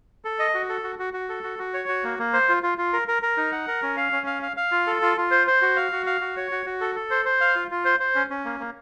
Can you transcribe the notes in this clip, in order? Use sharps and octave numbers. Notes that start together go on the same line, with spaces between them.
A4
D#5
F#4
A4
F#4
F#4
F#4
A4
F#4
F#4
C#5
F#4
A#3
A#3
C5
F4
F4
F4
A#4
A#4
A#4
D#4
F#5
A#4
C#4
F5
C#4
F5
F5
F5
F4
A4
F4
F4
C5
C5
F#4
F5
F#4
F5
F#4
C#5
F#4
F#4
A4
A4
C5
C5
F5
F4
F4
C5
C5
C#4
C#4
A#3
A#3